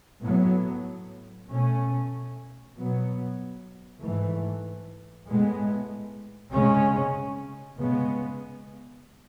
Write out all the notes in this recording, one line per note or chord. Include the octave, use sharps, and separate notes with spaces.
A2 F#3 B3
B2 A3 C#4
B2 F#3 B3
G#2 E3 A3
A2 G#3 B3
C#3 G#3 C#4
C#3 G#3 B3